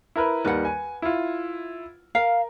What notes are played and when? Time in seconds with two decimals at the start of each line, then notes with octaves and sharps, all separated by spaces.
0.16 E4 A#4 B4
0.45 D#2 D#3 G3 B4 F#5
0.65 G#5
1.02 E4 F4
2.15 A#4 F5